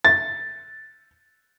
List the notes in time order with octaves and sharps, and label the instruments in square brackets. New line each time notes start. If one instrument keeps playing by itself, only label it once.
[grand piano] A6